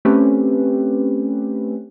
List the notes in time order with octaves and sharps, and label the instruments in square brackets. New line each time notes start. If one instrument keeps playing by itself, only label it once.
[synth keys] A3 C4 C#4 G4 B4